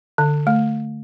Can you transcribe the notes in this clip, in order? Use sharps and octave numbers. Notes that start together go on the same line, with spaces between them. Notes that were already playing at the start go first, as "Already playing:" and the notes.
D3
A3